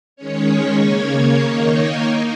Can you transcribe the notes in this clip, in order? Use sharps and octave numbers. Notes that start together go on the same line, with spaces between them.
D#3 G#3 C#4 C#5
C#5
C#3 A#3 C#4
D#3 A#3 D#4 C#5
A#4
A#3 D#4